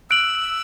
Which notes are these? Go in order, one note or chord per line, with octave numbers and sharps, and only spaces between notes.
E6 F#6 D7 F#7